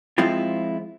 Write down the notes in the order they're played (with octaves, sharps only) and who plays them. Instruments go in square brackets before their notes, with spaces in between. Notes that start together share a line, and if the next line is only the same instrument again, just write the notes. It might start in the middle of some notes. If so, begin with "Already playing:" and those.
[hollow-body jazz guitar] F3 G#3 C4 E4 F4